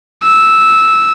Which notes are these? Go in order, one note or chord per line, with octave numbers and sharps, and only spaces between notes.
E6